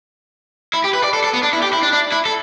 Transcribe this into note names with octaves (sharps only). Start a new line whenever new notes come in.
E4
G4
B4
D5
A4
A4
B3
D4
E4
G4
E4
D4
D4
E4
A4